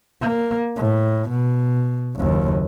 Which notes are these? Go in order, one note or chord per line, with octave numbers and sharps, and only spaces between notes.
A#3
A2
B2
F#1 D#2